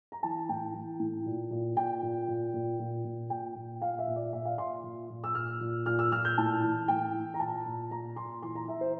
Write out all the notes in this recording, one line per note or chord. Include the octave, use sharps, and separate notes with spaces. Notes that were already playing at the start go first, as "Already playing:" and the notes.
A#5
E3 A5
A2 G5
E3
A2
A#2
A#2
A#2 G5
A#2
A#2
A#2
A#2
A#2
A#2 G5
A#2
A#2 F5
E5
A#2
D5
A#2 E5
F5
A#2 C6
A#2
A#2
E6
A#2 F6
A#2
A#2 F6
E6
A#2 F6
G6
A2 A5
E3
A2 G5
E3
A#5
A#2 A5
A#2
A#2 A#5
A#2 C6
E3 C6
A#5
E3 E5
C5